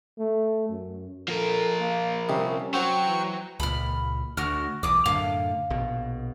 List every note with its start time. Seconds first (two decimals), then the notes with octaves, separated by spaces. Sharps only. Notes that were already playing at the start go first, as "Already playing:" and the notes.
0.19 A3
0.70 F#2
1.28 F3 A4 A#4
1.80 A#3
2.29 C2 C3 C#4
2.74 F#3 C4 F#4 G5 C#6
3.06 E3
3.60 C#2 A#2 B5 F6
4.37 D2 F#4 F6
4.83 B1 E2 D6 D#6
5.06 F#2 A2 D3 F5
5.70 A#1 B2